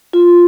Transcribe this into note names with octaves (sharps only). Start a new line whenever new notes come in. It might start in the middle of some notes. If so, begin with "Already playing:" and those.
F4